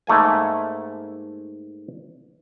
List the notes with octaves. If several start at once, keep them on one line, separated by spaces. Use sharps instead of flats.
G#2 A3 A#3 G#5